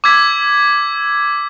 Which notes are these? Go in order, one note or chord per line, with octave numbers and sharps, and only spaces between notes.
D6 E6 G#6 B6